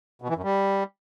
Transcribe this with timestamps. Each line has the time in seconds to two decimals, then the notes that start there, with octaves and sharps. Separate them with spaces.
0.22 B2
0.29 E3
0.36 F#2
0.44 G3